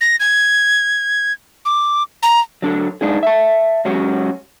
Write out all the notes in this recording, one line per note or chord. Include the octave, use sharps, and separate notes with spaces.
A#6
G#6
D6
A#5
F#3 D4 A4
G#3 D4 D#4 G#4
E5 A5
F#3 G#3 C#4 F#4 G4